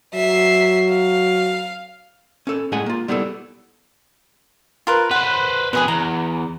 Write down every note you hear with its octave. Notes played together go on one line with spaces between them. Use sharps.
F#3 E5 C7
F5
C#4 A4
A2 G#3 G#4 D#5 F#5 G#5
A#3 F4
G3 B3 E4 G#4 A4
F4 A#4 B4
B4 C5 F#5
B2 G#4 B4 D5 G#5
E2 A#5